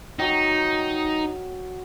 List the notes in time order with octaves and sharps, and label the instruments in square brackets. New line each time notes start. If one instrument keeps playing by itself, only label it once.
[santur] F#3 G5 [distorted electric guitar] D#4